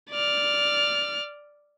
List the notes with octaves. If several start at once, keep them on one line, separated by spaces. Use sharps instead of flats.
D5 F6